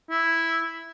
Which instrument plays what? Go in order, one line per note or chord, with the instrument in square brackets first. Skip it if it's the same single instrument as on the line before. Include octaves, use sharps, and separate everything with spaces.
[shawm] E4